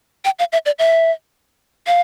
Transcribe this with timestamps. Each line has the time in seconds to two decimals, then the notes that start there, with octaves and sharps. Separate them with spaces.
0.25 G5
0.39 F5
0.52 E5
0.66 D5
0.79 E5
1.87 F5